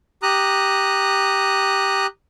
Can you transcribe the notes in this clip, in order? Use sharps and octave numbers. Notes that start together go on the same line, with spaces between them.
G4 A#5 D#6 F#6